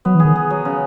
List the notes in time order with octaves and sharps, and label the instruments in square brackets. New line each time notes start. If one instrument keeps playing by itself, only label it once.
[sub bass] F#3 [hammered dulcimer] B3
[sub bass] E3
[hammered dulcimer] G#4
[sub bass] D#3
[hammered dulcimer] G#4
F#3
C#3